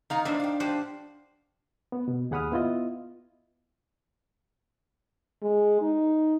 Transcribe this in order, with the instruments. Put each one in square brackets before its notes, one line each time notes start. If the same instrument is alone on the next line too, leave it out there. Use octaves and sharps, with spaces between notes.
[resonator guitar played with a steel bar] D#3 F5 A#5 [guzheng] D#4
[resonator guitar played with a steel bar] A2 E3 [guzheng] D4 C5 E5
[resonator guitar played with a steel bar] F5 G5
[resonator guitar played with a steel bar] F3 [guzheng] G4 C5 F#5
[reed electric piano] B3
B2
D#2 G#4 F#5 B5 D#6 F6
B3 E4 F4 D#5
[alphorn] G#3
D#4